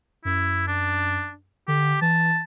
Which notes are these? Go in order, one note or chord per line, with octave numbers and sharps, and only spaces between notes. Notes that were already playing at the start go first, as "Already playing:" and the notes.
F#2 E4
D4
D3 G4
E3 A5